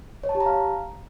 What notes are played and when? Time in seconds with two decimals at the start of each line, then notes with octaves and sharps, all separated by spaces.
0.24 C#5
0.29 A5
0.35 G4
0.40 A#5
0.46 F5